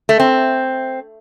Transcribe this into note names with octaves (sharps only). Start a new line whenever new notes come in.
A3
C4